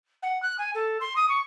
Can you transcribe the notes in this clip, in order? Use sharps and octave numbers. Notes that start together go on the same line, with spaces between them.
F#5
F#6
G#5
A4
C6
D#6
C#6